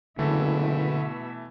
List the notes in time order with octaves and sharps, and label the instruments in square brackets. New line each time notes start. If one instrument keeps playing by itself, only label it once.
[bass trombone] F#1 [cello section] B2 E5 [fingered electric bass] D3 [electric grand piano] E3 A3